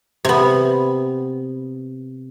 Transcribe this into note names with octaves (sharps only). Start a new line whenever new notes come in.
C3 B3